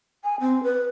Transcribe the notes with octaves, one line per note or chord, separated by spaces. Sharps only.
G#5
C4
B4